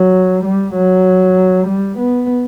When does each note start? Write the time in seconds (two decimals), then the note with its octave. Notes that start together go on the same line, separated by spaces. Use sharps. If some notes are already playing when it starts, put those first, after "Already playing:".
Already playing: F#3
0.44 G3
0.75 F#3
1.67 G3
1.98 B3